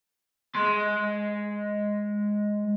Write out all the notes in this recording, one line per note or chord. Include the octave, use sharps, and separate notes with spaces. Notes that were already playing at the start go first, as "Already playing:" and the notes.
G#3 C6